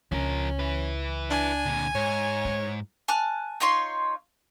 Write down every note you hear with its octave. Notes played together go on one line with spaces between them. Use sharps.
C#2 F3 C#4 A#4
E4 B4
D4 G#5
A#2 D3
G#2 C#5
E4
G#5 A5 F6 F#6
D#4 F4 C#5 C6